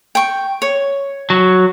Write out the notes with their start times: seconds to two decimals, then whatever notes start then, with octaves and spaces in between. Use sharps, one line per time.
0.15 G5 C#6
0.62 C#5
1.30 F#3